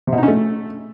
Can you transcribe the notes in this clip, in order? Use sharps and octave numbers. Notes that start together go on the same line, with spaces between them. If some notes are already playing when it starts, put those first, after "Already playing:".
C3
B2
D#4
C#4
A3